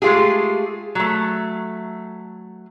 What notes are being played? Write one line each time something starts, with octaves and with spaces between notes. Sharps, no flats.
G#3 A3 F4 G4 G#4
F#3 A3